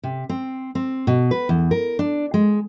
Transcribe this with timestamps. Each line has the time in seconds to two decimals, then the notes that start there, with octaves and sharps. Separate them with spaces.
0.03 C3
0.29 C4
0.75 C4
1.07 B2
1.31 B4
1.49 E2
1.71 A#4
1.99 D4
2.34 G#3